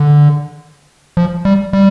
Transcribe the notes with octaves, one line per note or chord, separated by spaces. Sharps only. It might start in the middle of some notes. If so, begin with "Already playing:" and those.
Already playing: D3
F3
G3
G3